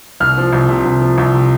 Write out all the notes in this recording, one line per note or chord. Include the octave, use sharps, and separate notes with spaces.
C2 F6
F3
C2
C3
C2
F3
C2
C3